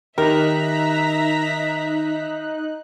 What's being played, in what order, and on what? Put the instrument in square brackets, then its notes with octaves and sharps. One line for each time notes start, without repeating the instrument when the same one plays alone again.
[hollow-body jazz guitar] D#3 G4 [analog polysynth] D#4 F#6 [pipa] A#4 [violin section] E5 A#5 B6